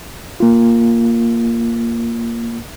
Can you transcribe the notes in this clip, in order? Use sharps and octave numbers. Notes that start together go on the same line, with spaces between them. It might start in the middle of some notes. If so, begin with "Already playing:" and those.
A#3 F4